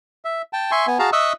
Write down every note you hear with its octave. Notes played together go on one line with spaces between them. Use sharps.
E5
G5 A5
E5 G#5 C6 C#6
B3 G#5
F#4 G#4 F5 A5 A#5
D#5 E5 C#6 D#6 E6 F#6